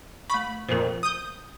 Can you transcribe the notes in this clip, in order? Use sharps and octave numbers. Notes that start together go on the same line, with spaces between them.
A3 B5 C#6
F2 A#2 A#4 C5
D#6 G6